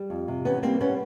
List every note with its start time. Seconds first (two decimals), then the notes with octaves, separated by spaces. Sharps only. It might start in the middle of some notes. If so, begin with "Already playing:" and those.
Already playing: G3
0.10 F2
0.28 C3
0.45 E3 B3 C#4
0.63 G3 A#3 C4
0.80 B3 C#4